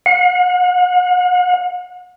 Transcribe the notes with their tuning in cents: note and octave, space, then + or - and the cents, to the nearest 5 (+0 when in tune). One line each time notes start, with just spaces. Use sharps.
F#5 -40